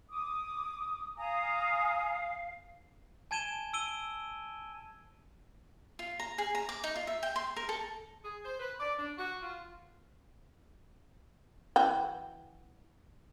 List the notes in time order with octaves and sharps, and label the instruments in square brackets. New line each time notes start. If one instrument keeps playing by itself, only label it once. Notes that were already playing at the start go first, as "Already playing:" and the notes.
[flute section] D6 D#6
[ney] F5 [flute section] G#5 A#5 D#6
[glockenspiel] G#5 A5 G#6 D#7 E7 G7
E6 D7 D#7 G7
[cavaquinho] F4
A#5
G#4
A#5
D6
D#4
F4
E5
G5
C6
A#4
A4
[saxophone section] G#4
C5
B4
D5
D4
F#4
F4
[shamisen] E3 F#4 G5